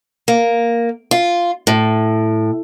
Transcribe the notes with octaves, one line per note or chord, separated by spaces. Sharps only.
A#3
F4
A2